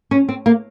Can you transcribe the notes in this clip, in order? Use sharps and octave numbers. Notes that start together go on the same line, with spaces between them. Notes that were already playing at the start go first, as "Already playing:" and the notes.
C#4
C4
A#3